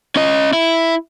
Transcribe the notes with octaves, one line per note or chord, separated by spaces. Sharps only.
C#4 D#5
E4